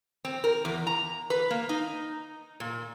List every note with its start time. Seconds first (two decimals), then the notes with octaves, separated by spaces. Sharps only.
0.25 C4
0.44 A#4
0.65 E2
0.87 A#5
1.30 B4
1.51 A#3
1.69 D#4
2.60 A#2